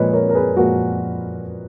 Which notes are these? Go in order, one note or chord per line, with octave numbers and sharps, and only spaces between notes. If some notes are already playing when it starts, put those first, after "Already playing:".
Already playing: A#2 F3 G#3 B4 C#5 D#5
A#4 C#5
A#4
G#4 B4
A#2 F3 G#3 F#4 A#4